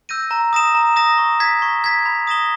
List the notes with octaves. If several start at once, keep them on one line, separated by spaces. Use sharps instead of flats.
E6 G6 A#6 D#7
A#5
D#6 A#6 E7
A#5
D#6 A#6 E7
C#6
G#6 B6
C#6
G#6 B6
B5
D#6 A#6 E7 G7